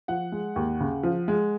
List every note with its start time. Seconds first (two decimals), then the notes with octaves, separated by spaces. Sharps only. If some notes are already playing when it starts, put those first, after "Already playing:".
0.08 F3 F#5
0.32 G#3
0.56 D#2
0.80 C#3
1.03 F3
1.28 G#3